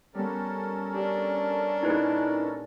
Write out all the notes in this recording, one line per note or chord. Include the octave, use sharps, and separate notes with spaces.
G3 B3 C#4 A4 A#4
D4 G4
A#2 D#4 E4 G#4 B4